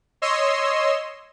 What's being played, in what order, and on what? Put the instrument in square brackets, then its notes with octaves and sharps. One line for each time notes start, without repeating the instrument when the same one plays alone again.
[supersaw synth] C#5 D#5 C6 E6